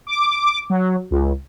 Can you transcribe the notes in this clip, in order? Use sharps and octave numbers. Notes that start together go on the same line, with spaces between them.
D6
F#3
C#2